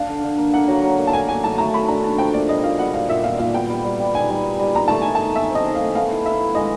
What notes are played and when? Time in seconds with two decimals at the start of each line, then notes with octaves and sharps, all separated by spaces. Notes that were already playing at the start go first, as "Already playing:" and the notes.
Already playing: D4 F5
0.08 D3
0.23 D3
0.38 A#3
0.53 A#3 F#5
0.68 F#3
0.83 F#3
0.98 A#3
1.07 A5
1.13 A3 G#5
1.29 F#4 G#5
1.43 A3 A5
1.58 A3 A#5
1.74 A3 B5
1.88 D4 A#5
2.04 F#4 A5
2.18 F3 G5
2.34 A#2 D5
2.49 G3 D#5
2.64 A#2 F5
2.79 G3 F#5
2.94 A#2 F5
3.09 A#2 E5
3.24 A#2 F5
3.39 A#2 F5
3.54 B3 G5
3.70 G3
3.84 G3
3.99 G3
4.15 D#4 G#5
4.30 G3
4.45 D#4
4.60 G3
4.75 D#4 A#5
4.88 A3 A5
5.02 D#4 G#5
5.15 A5
5.20 G#4
5.35 A3 E5
5.50 C4
5.55 D#5
5.65 G#4
5.75 F5
5.80 A3
5.95 B3 F5
6.10 E4
6.25 B3 E5
6.40 E4
6.55 G#3 D#5